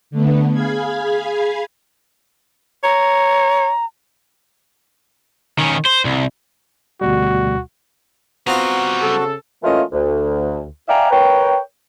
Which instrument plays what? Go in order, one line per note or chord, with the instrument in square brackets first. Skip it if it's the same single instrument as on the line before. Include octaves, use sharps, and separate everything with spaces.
[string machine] D3 A3 B3
G#4 F5 B5 G#6
[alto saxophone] C#5 [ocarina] A#5
[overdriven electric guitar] D#3 C#4
C5
C2
[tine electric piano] D2 B2 G3 [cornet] F#4
[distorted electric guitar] G3 A#5 [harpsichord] B3 C4 F4 [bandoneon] F#4
[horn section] C#3 A4
[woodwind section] E3 A3 A#3 C#4 F4 D#5
D2
D5 E5 F5 G5 G#5 A#5
A#4 B4 C#5 G5